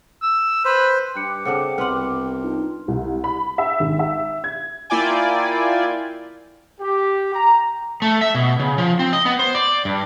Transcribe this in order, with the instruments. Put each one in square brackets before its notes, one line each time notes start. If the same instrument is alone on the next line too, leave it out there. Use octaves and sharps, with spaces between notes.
[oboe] E6
[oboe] B4 [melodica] C5
[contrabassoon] G2 [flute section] G5 D6 [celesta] F#6 C#7
[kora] C#3 C4 D4 [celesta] A4 F#5 C#7
[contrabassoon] C2 [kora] B3 F#5 [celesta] C6 F6
[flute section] D4 D#4 F4
[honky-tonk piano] C2
B5
E5
G#1
E5
G#6
[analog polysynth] A#3 E4 F4 D5 G5 G#5
[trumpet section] G4
A#5
[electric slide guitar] A3
E5
B2
C#3
F3
C4
D#5
B3
C5
D5
G2